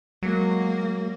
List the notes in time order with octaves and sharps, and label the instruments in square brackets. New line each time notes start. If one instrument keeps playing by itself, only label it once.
[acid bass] F#3 [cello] G#3 A#3